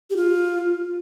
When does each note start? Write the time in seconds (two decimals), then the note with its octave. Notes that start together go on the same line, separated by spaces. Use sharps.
0.10 G4
0.17 F4